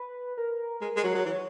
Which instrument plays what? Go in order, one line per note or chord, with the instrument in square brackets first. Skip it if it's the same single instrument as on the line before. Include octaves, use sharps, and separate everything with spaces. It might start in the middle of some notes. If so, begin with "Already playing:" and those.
Already playing: [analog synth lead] B4
A#4
[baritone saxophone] G#3 [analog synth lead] A#4
[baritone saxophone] G#3
F#3
F#3
[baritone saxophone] E3 [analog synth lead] C#5